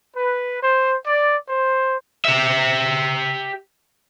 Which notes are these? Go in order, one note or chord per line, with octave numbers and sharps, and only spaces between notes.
B4
C5
D5
C5
G4 E5